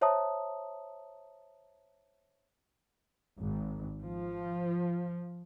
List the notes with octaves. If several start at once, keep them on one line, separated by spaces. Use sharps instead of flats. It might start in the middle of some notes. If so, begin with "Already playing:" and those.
C5 C#5 E5 A5 A#5 D#6
G#1
F3